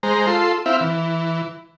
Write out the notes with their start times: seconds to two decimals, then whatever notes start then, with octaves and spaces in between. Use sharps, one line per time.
0.03 G#3 C5 A#5
0.27 F4 A4 C6
0.66 C4 E4 E5 F5
0.81 E3